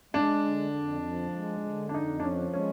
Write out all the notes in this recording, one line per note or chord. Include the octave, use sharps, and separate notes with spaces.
G#3 D4
D3
F2
F3
G#3
D3
D4
F2 D#4
D4
F3 C#4
G#3 C#4